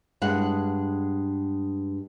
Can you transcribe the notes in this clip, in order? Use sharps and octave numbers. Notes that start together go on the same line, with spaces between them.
G2 G#3 F#5